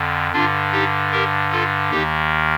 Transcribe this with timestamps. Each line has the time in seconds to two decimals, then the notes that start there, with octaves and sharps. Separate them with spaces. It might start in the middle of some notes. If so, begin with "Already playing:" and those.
Already playing: F2 D3
0.33 G2 D3 D4 F4
0.72 D#4 G4
1.12 G4 A#4
1.52 F4 A4
1.91 D#2 D#3 D#4 G4